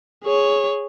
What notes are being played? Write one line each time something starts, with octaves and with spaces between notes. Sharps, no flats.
G#4 C#5